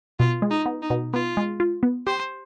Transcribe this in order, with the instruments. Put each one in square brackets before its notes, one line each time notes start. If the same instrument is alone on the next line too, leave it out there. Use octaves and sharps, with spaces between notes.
[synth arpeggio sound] B2 [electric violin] F4
[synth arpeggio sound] G#3
[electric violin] D#4
[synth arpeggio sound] B3
[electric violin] D#4
[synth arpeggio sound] B2
[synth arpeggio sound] B3 [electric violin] F4
[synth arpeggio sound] G#3
F4
B3
[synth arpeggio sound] G4 [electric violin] C5